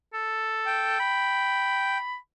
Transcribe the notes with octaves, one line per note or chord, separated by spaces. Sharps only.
A4
G5
B5